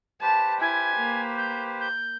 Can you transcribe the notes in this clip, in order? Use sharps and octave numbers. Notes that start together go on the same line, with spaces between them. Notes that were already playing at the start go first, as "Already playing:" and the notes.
G4 B4 C5 A5
E4 G#5
A#3
G6
G6